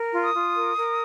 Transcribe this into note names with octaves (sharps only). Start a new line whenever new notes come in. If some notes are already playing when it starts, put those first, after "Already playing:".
Already playing: A#4
F4
D#6
F4
A#4
A#4